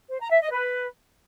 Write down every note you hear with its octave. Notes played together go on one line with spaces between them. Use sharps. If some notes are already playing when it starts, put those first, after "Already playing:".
C5
A#5
E5
D#5
B4